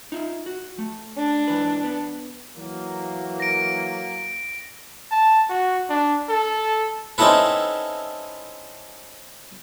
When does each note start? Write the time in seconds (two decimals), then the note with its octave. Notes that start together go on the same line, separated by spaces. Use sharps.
0.12 D#4 F4 E5
0.46 F#4
0.79 A3
1.16 D4
1.47 G#2 E3 B4
1.84 B3
2.56 E3 F#3 A#3
3.40 A#6 D7
5.11 A5
5.49 F#4
5.89 D4
6.29 A4
7.18 C4 C#4 D#4 E4 A4 B4